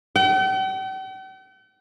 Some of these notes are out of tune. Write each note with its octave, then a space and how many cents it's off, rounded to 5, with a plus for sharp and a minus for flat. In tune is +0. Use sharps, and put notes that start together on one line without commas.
G5 -45